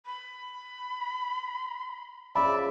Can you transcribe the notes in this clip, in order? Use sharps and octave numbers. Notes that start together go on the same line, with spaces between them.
B5
C#3 F3 D5 E5 B5